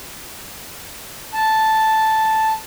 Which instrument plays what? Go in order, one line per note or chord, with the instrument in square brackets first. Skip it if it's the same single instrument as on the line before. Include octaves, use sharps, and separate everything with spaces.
[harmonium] A5